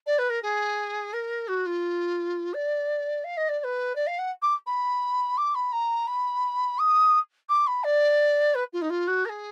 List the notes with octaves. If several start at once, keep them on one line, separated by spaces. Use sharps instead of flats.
D5
B4
A#4
G#4
A#4
F#4
F4
D5
F5
D#5
D5
D5
B4
D5
F5
F#5
D6
B5
D6
B5
A#5
B5
D#6
D6
B5
D5
B4
F4
D#4
F4
F#4
A#4
G#4